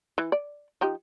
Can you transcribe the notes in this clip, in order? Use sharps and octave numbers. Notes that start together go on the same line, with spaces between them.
E3
D5
F3 D#4 G4